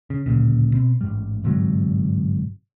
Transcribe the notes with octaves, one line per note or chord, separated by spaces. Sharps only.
C#3
D1 G1 A#2 C#3
B2 C4
A1 G#2 G3
G1 G#2 C3 F#3